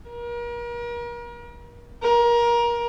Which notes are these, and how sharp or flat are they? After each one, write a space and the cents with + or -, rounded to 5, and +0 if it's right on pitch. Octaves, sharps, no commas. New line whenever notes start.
A#4 +40
A#4 +25